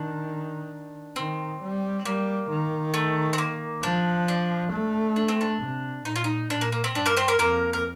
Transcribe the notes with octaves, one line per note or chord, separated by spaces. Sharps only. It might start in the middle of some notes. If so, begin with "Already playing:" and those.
Already playing: D#3 D4
D#3 C4
G3
G3 A#3
D#3
A3
C4
A#3
F3 D4
D4
A3
D4
C4
D4
C3
A#2 D#4
F4
D#4
A#2 D4
A#3
A#3
C4
G2 D4
A#3 A#4
C4 C5
A#3 A#4
F2 A#3 A#4
A#4